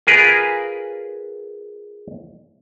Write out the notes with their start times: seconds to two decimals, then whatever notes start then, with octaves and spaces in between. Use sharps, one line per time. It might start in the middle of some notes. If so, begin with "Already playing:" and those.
0.07 F4 G#4 A#4 B4